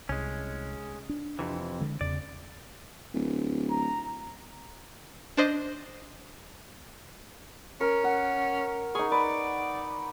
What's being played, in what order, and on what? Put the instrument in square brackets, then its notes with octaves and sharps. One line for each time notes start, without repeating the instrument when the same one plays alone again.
[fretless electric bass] C2 [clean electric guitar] G#3 C#4
[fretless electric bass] D4
[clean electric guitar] F2 C3 E3
[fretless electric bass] D3 G#3
[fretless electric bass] E2 C#3 [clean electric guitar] D5
[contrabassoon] D1
[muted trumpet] A#5
[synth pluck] D4 C5 D#5
[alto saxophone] C#4 [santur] A#4
[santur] F#5
[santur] D#4 C#6 [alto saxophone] G#4
[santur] B4 [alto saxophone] D5